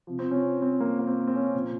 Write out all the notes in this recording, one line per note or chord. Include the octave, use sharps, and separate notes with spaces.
C3 F3
C4
C#4
C4
A#3
A#3
C4
C4
C#4
A#2 F3